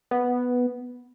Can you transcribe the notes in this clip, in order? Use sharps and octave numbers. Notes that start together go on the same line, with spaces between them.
B3